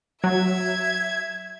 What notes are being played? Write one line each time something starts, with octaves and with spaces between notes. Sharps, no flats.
F#3 E5 G#6